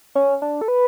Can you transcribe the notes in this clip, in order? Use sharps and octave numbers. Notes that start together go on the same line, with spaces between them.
C#4
D4
A4
B4